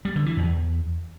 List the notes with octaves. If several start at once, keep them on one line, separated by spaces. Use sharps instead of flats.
G3
D3
E3
E2